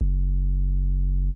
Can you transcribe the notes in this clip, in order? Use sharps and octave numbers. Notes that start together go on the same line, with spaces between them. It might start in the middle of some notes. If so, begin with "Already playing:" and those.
F#1